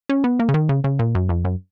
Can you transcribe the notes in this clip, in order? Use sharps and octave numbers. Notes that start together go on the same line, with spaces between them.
C#4
B3
A#3
C#3
D#3
C#3
C#3
A#2
F#2
F2
F#2